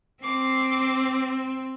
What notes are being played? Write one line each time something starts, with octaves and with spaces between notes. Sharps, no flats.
C4 D6 C7